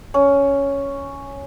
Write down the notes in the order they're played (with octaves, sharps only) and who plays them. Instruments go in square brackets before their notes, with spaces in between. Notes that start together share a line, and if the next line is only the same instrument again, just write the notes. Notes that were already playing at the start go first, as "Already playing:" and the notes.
[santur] C#4